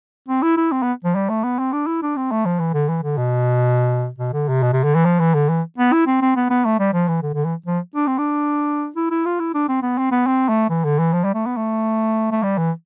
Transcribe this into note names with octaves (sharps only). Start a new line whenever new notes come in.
C4
E4
E4
C4
B3
F3
G3
A3
B3
C4
D4
E4
D4
C4
A3
F3
E3
D3
E3
D3
B2
B2
D3
C3
B2
C3
D3
E3
F3
E3
D3
E3
B3
E4
C4
C4
B3
B3
A3
G3
F3
E3
D3
D3
E3
F3
D4
C4
D4
E4
E4
F4
E4
D4
C4
B3
C4
B3
C4
A3
E3
D3
E3
F3
G3
A3
B3
A3
A3
G3
E3